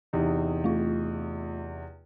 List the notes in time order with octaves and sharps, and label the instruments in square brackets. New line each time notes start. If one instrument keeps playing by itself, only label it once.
[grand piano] E2 C3 D#4
[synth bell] A3 F4